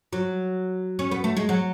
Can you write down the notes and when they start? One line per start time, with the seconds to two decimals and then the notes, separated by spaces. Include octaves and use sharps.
0.13 F#3
0.99 C#4
1.11 B3
1.24 A3
1.37 G#3
1.49 F#3